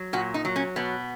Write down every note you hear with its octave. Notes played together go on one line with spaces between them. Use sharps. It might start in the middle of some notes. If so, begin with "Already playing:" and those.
Already playing: F#3
A#2 F#4
D#4
F#3
C#4
B2 B3